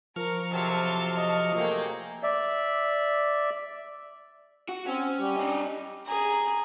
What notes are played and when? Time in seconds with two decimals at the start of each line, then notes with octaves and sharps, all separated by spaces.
0.16 F3 A#4 C#6 F6
0.51 F2 C3 F#3 A5 C6
1.17 D#5
1.56 A3 A#3 G#4 G5
2.23 D5 E5
4.69 F#4
4.86 C4 C#4
5.20 G3 G4
5.36 D4 D#5
6.06 G#4 A#5